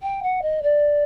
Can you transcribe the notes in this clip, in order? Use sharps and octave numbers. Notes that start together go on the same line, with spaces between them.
G5
F#5
D#5
D5